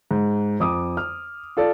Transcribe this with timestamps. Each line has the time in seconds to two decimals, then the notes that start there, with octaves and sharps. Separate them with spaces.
0.11 G#2
0.60 F2 D6 D#6
0.97 F6
1.57 F4 A4 D5